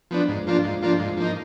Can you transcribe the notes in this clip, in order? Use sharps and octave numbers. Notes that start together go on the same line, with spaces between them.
F3 B3 D4
G#2
F3 A#3 D4 F4
G#2
F3 A#3 D4 F4
G#2
F3 A#3 D#4